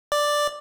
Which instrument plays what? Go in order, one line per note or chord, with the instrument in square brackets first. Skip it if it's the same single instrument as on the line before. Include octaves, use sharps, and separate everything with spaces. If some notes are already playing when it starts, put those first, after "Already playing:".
[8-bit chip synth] D5